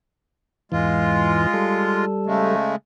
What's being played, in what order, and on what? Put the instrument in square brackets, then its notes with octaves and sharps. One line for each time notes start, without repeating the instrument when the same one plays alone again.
[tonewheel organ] E2 G#2 E3 [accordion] G#3 F4
[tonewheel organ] G3 A4
[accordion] C#3 G#3 A3